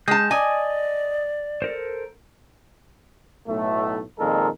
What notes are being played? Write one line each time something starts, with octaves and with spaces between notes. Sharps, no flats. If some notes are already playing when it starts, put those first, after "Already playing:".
G#3 A5 G6
D5 D#5 G#5 D6 D#6
A4 A#4 C5
B1 A2 A3
F2 A#2 D#3 G#3 A4 A#4